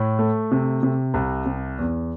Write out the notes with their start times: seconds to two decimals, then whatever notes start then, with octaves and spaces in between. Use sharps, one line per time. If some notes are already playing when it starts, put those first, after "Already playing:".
Already playing: A2
0.19 A3
0.51 C3
0.83 C3
1.14 C2
1.46 C3
1.79 E2